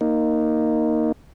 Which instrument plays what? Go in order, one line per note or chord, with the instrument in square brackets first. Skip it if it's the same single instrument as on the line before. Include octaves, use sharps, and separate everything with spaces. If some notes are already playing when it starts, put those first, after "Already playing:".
[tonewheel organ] A#3 D#4